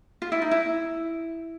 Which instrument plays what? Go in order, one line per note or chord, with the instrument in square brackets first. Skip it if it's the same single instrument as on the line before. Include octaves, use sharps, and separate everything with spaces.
[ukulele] F4
E4
D#4
E4